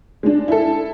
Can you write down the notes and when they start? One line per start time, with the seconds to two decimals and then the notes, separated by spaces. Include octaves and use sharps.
0.23 G#3 D4
0.48 E4 A4